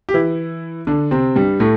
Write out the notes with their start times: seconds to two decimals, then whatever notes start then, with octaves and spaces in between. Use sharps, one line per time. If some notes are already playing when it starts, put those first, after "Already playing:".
0.09 G4
0.14 E3 E4
0.87 D3 D4
1.11 C3 C4
1.36 G2 G3
1.60 A2 A3